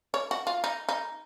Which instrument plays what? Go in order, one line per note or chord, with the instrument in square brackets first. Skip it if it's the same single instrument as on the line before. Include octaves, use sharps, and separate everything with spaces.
[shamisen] C#5
F#4
F4
D#4
D#4